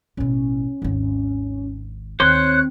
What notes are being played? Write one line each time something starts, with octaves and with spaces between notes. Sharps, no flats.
A1 B2 C#4
G#1 D#2
D#2 C4 C5 C#5 C6 F#6